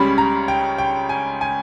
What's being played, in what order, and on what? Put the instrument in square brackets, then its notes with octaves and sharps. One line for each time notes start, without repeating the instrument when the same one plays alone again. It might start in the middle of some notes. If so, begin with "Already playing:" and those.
Already playing: [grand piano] C#2 C#3 G3 C#4 B5
A#5
G5
G5
G#5
G#5